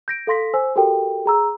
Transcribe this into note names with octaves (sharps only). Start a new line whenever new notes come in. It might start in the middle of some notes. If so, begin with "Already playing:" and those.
G6 A#6 D7
A4 F5 C6 A#6 B6
C5 G#5 E6
F#4 G4 A4 A#4 G5
G#4 A#5 E6